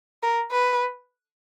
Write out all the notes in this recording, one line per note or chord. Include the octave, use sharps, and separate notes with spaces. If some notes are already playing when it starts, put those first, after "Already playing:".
A#4
B4